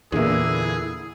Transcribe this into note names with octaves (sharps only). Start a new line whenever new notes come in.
E2 A#2 D3 A#3 E4 G#4